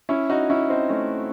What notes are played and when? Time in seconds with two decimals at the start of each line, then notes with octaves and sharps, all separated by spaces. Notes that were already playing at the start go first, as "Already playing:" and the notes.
0.09 C#4 E4
0.30 D#4 F#4
0.50 C#4 E4
0.70 C4 D#4
0.89 A3 C#4